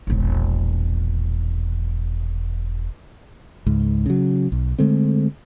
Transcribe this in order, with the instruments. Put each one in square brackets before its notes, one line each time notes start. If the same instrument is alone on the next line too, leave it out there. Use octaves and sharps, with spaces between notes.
[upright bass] E1 A#1
[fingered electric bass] C#2 G#2
C#3 F#3
B1
D3 G#3 A3 C4